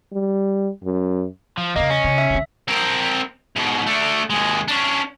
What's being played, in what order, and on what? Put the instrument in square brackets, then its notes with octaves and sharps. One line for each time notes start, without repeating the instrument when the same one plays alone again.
[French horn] G3
F#2
[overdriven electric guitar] F3
[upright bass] E2 C#3 [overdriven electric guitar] A#3 [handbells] D#5
[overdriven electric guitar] C#4
[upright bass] C#3
[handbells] E5
[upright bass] B2 D3
[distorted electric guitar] C4 A#4
G#2 B2
A3 D4
D#2 G#3
C#4 D4